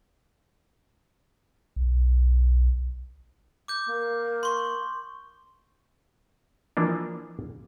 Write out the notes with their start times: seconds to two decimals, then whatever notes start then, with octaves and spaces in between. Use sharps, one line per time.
1.76 B1
3.68 D6 G6
3.86 A#3
4.43 C6 C#6
6.77 E3 F3 A#3 D4